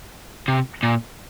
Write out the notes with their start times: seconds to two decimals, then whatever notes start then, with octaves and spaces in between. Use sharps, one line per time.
0.48 C3
0.83 A#2